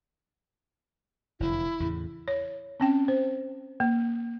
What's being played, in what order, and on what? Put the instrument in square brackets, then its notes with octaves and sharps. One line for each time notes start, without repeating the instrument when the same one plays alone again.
[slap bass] F1 E2 D3 [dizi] E4
[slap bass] E2 A2 C#3
[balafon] C#5
C4 C#4 G5
C5
A#3